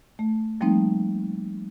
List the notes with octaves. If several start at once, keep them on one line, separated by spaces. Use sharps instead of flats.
A3
F3 G3 A3 A#3 C4 D#4